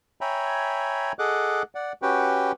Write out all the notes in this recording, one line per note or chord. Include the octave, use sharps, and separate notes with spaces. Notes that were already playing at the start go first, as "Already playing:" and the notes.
C#5 E5 G5 G#5 A#5 B5
G#4 A4 D#5 F#5 D6 F#6
D5 F#5
C#4 F#4 G4 B4 G5